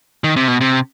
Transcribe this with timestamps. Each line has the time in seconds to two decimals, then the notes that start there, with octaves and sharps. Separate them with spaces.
0.24 D#3
0.36 C3
0.48 B2
0.61 C3